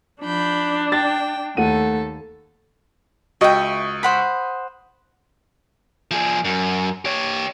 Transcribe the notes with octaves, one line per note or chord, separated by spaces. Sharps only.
F3 D4 B5 G6
G5 A6
D#2 A3 A4 F#5 D#7
C#2 F#4 D#5 E5 G5 C#6 D#6
C5 F#5 B5
F3 G#4
F#2
G4 C#5